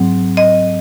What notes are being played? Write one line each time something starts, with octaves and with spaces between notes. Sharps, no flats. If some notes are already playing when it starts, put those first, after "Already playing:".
Already playing: G#2 F#3 C4
D#5